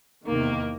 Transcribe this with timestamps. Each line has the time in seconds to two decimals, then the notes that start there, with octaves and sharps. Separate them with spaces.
0.26 E2 C3 D#3 A#3